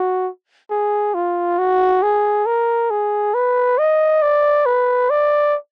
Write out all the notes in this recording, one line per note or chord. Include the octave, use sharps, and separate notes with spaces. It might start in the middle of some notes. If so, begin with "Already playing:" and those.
Already playing: F#4
G#4
F4
F#4
G#4
A#4
G#4
B4
D#5
D5
B4
D5